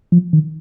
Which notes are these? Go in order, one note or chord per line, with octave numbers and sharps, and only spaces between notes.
F3
D#3